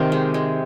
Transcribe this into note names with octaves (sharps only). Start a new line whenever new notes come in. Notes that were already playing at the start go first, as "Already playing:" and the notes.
Already playing: C3 D#3 F5
G#3
G#3